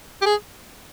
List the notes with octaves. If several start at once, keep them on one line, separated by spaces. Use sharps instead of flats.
G4
G#4